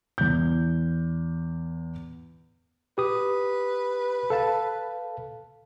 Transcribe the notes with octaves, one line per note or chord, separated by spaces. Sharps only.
E2 G6
G4 B4 D#6
A4 F5 A5